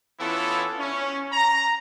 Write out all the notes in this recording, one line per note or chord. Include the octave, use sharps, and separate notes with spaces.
E3 B3 C#4 E4 F4 A4
C#4
A#5